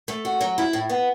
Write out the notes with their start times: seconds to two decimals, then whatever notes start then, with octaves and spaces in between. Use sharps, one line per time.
0.08 A3
0.25 F#4
0.41 F#3
0.58 E4
0.73 A2
0.89 B3